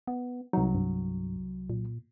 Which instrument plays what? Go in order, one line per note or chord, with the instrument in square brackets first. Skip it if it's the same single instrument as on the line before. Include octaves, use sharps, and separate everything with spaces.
[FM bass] B3
[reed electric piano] C2 F#3 [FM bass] D#4
[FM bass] G2
A#2